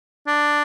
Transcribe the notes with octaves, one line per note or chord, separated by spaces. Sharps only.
D4